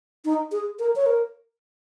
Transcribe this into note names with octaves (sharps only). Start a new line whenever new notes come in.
D#4
G#4
A#4
C#5
A#4